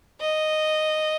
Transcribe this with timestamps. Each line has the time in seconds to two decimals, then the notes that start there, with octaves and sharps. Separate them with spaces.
0.21 D#5